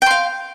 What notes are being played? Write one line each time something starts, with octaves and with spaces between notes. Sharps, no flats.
F5 G5 C6